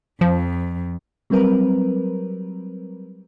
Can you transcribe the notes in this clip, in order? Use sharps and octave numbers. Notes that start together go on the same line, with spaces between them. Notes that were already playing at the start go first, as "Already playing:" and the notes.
F2 F3
F#3 G3 C4 A#4 B4